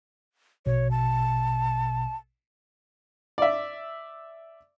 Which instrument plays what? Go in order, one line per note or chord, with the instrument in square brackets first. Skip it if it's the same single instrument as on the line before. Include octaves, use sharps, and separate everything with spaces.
[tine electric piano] A#1 B2 [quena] C#5
[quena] A5
[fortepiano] D5 E5